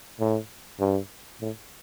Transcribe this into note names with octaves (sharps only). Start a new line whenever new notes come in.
A2
G2
A2